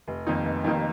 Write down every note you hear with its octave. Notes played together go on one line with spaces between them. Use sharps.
F1
F2 D#3 A#3 D#4
F1
F2 D#3 A#3 D#4